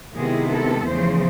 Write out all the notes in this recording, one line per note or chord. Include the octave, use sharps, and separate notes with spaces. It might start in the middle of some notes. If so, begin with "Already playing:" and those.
C3 D#3 G#3 B3 E4 G#4
A4
E2 C#3 F3 A3 C5